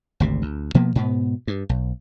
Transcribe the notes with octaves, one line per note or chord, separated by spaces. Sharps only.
G#1 D2 C3
D2
B2 F3 A#3 B3
G#2 B2 B3
G2
B1